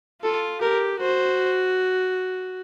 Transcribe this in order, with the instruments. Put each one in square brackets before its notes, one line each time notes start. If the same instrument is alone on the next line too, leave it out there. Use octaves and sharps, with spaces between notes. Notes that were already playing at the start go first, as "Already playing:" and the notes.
[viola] F4 [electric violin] A4
[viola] G4 [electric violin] A#4
[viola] F#4 [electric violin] C5